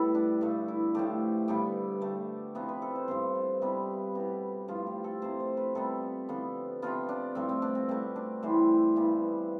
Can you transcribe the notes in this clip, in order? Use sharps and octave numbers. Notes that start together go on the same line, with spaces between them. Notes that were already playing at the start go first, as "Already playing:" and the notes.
Already playing: A2 G3 B3 G4 A4 B4
D4
G2 D3 A3
E4
A2 F3 A3 G4
G2 D3 G3 B3 G4
D3 A3
C3 F3 B3
B4
A4
C5
G2 F3 B3 C5
C5
C3 G3 B3 B4
B2 B3 G4
G2 F3 A3 F4
G4
A4
C3 F3 A3 C5
C5
B4
C3 G3 B3 A4
D3 F3 B3
C3 F3 B3 F4
D4
G2 F3 A3 C4
C4
D4
C4
B2 A3 C4
D4
A2 E3 G3 C5
G2 E3 G3 B3